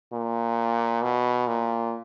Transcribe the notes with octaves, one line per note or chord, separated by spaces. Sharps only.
A#2
B2
A#2